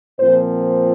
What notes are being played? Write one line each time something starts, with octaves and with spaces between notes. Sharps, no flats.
A#2 F3 C4 C5